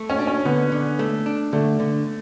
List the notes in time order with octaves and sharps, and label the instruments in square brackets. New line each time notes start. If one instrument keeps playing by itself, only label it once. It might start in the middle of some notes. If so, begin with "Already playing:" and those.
Already playing: [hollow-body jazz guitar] A3
[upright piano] C#4
[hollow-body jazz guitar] D4
[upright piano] C#4
[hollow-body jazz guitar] D3 [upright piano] B3
[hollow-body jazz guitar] D3
A3
D4
[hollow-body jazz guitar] D3 [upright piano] A3
[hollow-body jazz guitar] D3